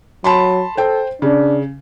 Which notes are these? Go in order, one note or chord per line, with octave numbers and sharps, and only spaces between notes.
F#3 A5 B5 C6
A4 C5 G5
C#3 D4